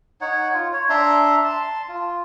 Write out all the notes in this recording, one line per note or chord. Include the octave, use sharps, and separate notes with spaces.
D#4 C#5 F#5
F4
C#5
D4 E5 A#5 C6
A5 C6
F4